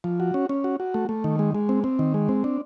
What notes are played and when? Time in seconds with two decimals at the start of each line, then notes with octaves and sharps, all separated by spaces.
0.04 F3
0.20 F#4
0.34 C#4
0.49 C#4
0.64 F#4
0.80 F#4
0.94 A3
1.09 A3
1.24 D#3
1.39 G#3
1.54 G#3
1.69 C4
1.84 C4
1.99 D#3
2.14 G#3
2.29 C4
2.44 D4